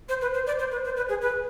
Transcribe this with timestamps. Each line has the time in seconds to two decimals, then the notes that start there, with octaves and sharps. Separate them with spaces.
0.09 C5
0.21 B4
0.34 C5
0.47 D5
0.59 C5
0.72 B4
0.85 C5
0.97 B4
1.09 G#4
1.22 B4